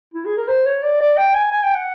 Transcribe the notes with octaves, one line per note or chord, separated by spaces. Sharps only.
E4
G#4
A#4
C5
C#5
D5
D5
G5
G#5
G#5
G5
F#5